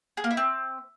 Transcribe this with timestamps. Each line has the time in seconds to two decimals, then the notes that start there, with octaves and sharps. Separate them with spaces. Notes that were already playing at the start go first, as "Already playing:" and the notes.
0.17 G#4
0.24 A#3
0.31 E4
0.37 C4